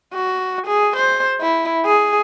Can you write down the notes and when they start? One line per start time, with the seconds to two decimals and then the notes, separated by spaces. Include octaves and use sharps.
0.14 F#4
0.67 G#4
0.97 C5
1.41 E4
1.85 G#4